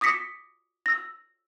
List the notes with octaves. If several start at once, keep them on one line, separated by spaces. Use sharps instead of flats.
D6 D#6 A#6 B6 C#7
E6 A#6